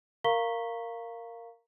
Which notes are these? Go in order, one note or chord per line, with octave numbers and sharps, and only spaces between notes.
A#4 F5 A#5 C#6 B6 G7